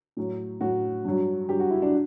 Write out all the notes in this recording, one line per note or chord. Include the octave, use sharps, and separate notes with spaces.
A2 F#3
A2 F#3 F#4
G2 F#3
G2 F#3 G4
F#4
E4
D4